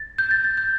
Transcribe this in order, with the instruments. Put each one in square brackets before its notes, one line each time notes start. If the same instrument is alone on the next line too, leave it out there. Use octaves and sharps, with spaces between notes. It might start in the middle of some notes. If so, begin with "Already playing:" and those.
Already playing: [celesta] A6
G6
A6
A6
G6